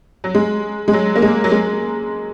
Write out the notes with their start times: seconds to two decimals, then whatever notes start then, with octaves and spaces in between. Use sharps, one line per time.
0.24 F#3
0.34 G#3
0.88 G#3
0.93 F#3
1.16 A#3
1.22 G#3
1.44 F#3
1.51 G#3